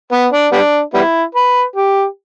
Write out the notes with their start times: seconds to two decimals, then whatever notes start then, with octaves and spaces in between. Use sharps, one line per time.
0.12 B3
0.33 D4
0.52 G3 B3 D4
0.94 G3 B3 E4
1.35 B4
1.76 G4